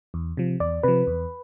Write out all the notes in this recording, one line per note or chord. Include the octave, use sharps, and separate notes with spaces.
E2
C3 F3
E2 D5
C3 F3 B4
E2